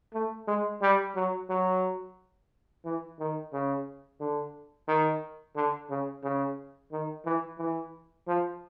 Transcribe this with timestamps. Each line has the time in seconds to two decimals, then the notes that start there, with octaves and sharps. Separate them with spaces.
0.14 A3
0.48 G#3
0.82 G3
1.16 F#3
1.50 F#3
2.85 E3
3.19 D#3
3.53 C#3
4.20 D3
4.88 D#3
5.56 D3
5.90 C#3
6.24 C#3
6.92 D#3
7.25 E3
7.59 E3
8.28 F3